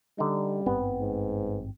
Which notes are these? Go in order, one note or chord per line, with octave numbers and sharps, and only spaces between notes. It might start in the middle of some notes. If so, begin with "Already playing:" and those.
D3 G3 D#4
G#1 G2 B3 C4
G#2